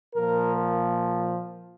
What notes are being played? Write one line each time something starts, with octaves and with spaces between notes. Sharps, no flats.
A#2 F3 A#4